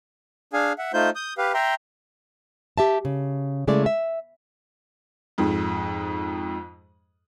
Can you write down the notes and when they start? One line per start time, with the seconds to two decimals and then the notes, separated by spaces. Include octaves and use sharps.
0.53 D4 G#4 F5 G#5
0.78 E5 F#5
0.94 A3 D#4 F4 C5 G6
1.15 D#6 G6
1.38 G4 B4 F5
1.54 E5 G5 A#5 C6
2.78 G4 E5 A5
3.05 C#3
3.67 C#3 G#3 A3 E4 D5
3.86 E5
5.38 F2 G#2